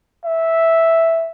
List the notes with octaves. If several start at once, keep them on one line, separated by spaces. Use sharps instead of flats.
E5